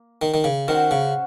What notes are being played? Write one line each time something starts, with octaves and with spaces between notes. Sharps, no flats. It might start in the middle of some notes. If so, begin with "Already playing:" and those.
Already playing: A#3
D#3
D#3
C#3
D#3 C#4 F#4 C5 F#5
C#3